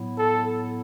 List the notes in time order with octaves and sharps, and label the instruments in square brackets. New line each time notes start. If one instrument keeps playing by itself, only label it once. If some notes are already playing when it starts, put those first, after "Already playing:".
Already playing: [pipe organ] A2 F#3 B3 E4
[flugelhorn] A4